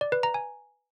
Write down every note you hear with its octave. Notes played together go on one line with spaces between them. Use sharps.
D5
B4
A#5
G#5